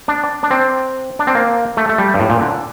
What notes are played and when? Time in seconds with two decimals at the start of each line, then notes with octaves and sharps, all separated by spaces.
0.08 D4
0.43 D4
0.51 C4
1.19 D4
1.27 C4
1.35 A#3
1.77 A3
1.89 A3
1.98 G3
2.14 G2
2.20 A2
2.30 A#2
2.41 D3